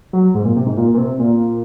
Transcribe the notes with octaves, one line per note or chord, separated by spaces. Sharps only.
F#3
G#2
A#2
C3
G#2
A#2
A#2
C3
A#2